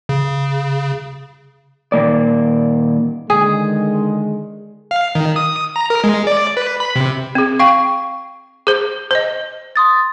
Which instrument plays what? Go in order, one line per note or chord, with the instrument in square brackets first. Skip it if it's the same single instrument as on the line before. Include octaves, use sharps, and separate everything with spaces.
[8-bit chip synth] C#3
[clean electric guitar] A#2 D#3 A#3 D5
[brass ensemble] D3 D#3 G#3 [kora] G#4
[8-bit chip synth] F5
D#3
D#6
A#5
A#4
G#3
D5
B4
B5
C3
[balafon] C4 G#4
[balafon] F5 G5 [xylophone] C#6
[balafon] G#4 C5
C5 D#5
[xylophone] C6 D#6 A6